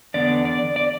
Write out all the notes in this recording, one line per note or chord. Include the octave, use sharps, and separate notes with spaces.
E2 D3 B3 D5
D5
D5